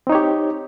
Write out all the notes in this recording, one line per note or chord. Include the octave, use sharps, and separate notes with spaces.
C4 D#4 G4 C#5